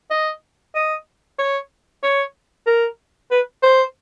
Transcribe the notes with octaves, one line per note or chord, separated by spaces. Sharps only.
D#5
D#5
C#5
C#5
A#4
B4
C5